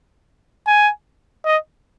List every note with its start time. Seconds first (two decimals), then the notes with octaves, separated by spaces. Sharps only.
0.67 G#5
1.45 D#5